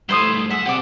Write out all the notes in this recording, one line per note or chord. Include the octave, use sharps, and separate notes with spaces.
G2 A3 E4 C5 D#6
B1 G#4 E5 F#5
C4 G4 D5 F#5